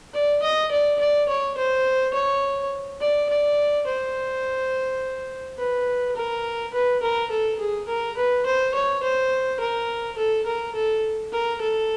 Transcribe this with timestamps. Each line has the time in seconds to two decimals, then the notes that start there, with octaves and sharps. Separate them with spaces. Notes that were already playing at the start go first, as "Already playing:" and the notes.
0.14 D5
0.42 D#5
0.71 D5
1.00 D5
1.28 C#5
1.57 C5
2.14 C#5
3.01 D5
3.29 D5
3.87 C5
5.58 B4
6.16 A#4
6.74 B4
7.03 A#4
7.31 A4
7.59 G#4
7.88 A#4
8.17 B4
8.46 C5
8.75 C#5
9.03 C5
9.60 A#4
10.18 A4
10.46 A#4
10.75 A4
11.32 A#4
11.62 A4